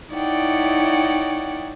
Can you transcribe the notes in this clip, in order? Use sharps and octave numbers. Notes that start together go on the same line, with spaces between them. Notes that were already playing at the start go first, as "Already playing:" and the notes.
D#4 E4 C#5 D5 F#5 G5